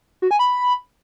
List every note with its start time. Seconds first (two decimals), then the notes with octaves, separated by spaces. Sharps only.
0.22 F#4
0.31 G#5
0.39 B5